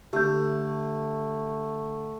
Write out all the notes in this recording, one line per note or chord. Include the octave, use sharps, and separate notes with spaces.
D3 A3 G4 G6